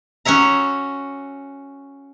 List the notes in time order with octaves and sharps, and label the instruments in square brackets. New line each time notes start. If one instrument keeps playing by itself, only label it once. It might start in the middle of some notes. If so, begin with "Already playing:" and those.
[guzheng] C#4 F#4 C#5 E5 A#5